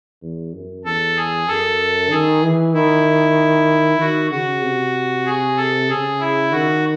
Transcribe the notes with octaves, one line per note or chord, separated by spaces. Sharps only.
E2
F#2
E2 A4
G#4
F#2 A4
D#3 G#4
E3
D#3 E4
D#3 F#4
C#3 F#4
C3
G#4
A4
C#3 G#4
E4
D#3 F#4